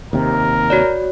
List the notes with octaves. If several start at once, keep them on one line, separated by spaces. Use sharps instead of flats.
D#2 C3 A#4
F#4 C#5 D5